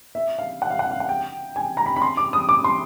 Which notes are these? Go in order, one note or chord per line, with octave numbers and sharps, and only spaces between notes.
E5
F5
F#5
F5
F#5
F5
F#5
G5
G#5
A#5
B5
B5
C6
D6
D#6
D6
C6